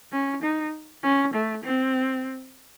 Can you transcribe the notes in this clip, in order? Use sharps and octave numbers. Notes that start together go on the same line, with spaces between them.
C#4
D#4
C#4
A3
C4